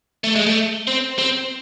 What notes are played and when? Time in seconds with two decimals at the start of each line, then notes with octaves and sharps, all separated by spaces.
0.24 A3
0.36 G#3
0.46 A3
0.87 C4
1.19 C4